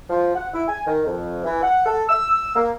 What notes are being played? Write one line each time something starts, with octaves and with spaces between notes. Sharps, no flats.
F3
F#5
E4
G#5
D#3
F2
E3
F#5
A4
E6
A#3